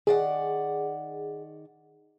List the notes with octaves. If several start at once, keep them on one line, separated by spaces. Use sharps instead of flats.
D#3 G#4 D5 F#5